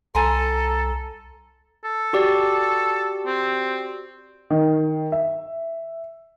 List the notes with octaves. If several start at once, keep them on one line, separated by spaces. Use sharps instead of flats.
C2 A4 G#5 A#5 C6
A4
F#4 G4 D5
C4
D#3
E5